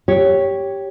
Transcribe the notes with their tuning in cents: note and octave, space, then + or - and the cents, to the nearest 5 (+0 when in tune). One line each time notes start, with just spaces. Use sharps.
G4 +0 C#5 +0